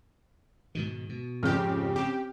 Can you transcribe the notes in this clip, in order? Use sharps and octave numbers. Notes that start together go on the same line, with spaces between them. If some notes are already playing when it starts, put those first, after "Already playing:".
G#2 B2 D#3
B2
F2 G#2 C#3 G4 F6
C4 G4